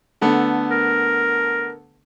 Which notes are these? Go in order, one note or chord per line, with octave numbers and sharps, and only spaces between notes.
D3 A3 B3
A#4